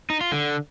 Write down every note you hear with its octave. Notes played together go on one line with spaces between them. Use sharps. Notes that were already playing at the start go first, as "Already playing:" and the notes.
D#4
F4
D3